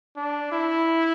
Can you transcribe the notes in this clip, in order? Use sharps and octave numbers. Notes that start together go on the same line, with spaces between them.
D4
E4